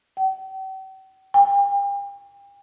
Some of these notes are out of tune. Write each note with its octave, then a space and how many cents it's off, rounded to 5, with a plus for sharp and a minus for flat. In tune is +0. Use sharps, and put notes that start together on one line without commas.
G5 -45
G5 +40